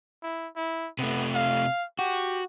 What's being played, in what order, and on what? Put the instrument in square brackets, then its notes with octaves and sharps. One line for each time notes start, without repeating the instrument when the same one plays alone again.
[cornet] E4
E4
[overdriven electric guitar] C3 A3 [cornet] B3
[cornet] F5
[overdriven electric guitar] F#4 [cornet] G4